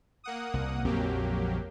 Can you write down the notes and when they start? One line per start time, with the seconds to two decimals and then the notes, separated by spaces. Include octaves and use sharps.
0.24 A#3 F#5 D#6
0.54 C2
0.85 A#1 F2 F#3 A#3 C4 G4